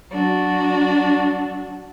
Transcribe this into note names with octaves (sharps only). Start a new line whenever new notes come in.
F#3 D4 F#4